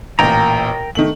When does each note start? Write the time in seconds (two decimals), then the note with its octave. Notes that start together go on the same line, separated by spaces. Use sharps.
0.19 A1 A#2 A#4 G5 A#5
0.95 D#3 A3 F#7